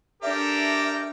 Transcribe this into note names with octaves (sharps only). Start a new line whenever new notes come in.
D4 G4 A4 A#4 E5